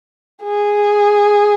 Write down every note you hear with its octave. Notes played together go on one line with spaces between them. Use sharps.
G#4